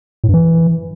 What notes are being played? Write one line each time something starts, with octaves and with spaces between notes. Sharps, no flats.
A2
G2
E3